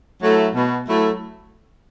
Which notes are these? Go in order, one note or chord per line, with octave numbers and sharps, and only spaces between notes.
F#3 A3 E4
B2
F#3 A3 E4